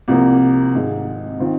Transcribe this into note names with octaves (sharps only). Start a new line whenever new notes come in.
C2 C3 F3 A#3
G#1 G#2 G#3
D#3 C4 F4